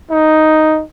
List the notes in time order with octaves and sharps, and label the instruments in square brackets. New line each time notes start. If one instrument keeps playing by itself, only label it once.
[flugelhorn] D#4